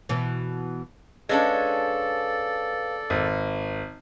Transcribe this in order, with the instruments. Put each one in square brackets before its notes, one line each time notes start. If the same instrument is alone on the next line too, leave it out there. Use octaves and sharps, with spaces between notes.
[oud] B2 E3
[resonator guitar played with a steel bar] G#3 C#4 D4 [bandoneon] A4 D5 [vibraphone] B4 F5
[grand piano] G#1